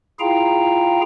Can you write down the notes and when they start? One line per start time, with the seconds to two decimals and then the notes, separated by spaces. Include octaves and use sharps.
0.20 E4 F4 G#4 F5 G5 A#5